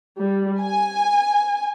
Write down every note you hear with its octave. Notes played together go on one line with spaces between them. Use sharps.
G3
G#5